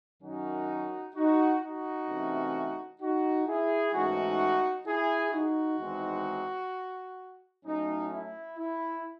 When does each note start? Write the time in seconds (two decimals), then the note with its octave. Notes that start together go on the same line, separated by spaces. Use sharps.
0.22 F#2 D#3 F#3 C#4 D#4 F#4
1.15 D#4 F#4
1.61 D#4 F#4
2.09 C3 E3 A3 C#4
3.01 D#4 F#4
3.48 E4 G#4
3.93 G#2 E3 A3 C#4 D#4 F#4
4.87 E4 G#4
5.33 D#4 F#4
5.79 E2 D#3 G#3 C4 D#4
7.65 A2 F#3 A3 C#4 D#4
8.12 E4
8.58 E4